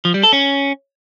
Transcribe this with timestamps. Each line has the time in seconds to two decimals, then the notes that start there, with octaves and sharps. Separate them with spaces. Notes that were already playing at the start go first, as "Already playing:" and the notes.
0.05 F3
0.14 G3
0.23 A4
0.33 C#4